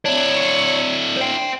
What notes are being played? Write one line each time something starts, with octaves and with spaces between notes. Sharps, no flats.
D4 E4 C#5
C5 G5